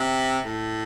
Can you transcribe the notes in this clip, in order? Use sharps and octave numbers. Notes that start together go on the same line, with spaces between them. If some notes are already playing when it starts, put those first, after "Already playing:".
Already playing: C3
A2